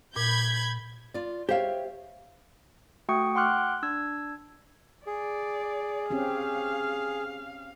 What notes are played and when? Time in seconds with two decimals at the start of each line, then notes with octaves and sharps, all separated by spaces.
0.16 A#2 B5 G6 G#6
1.14 F4 D5
1.49 G4 C5 C#5 E5 F5
3.09 A3 F#4 G5 C#6 D#6 C#7
3.35 F#5 G5 C6 D6 F6 F#6
3.82 D4 E6 G#6
5.07 G#4 D5
6.10 C4 C#4 G4 F5